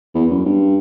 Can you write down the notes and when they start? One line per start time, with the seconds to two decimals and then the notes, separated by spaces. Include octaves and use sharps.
0.15 E2
0.30 F#2
0.45 G2